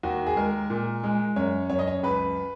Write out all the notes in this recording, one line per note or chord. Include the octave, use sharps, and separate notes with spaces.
D#2 F#4
G#4
G#3 A#4
A#2
G#3
F#2 C#5
F#2 C#5
D#5
C#5
C#2 B4